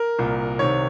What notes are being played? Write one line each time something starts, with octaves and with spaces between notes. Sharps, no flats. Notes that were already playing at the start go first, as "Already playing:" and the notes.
Already playing: A#4
C2 A#2
C2 C3 D#3 C#5